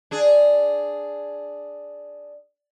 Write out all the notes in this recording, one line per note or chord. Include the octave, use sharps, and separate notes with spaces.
D4 G#4